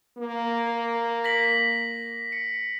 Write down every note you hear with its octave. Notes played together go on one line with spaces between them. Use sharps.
A#3
A#6 B6 F#7
C#7